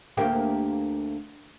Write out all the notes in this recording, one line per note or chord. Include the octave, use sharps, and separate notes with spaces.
D2 A#3 G4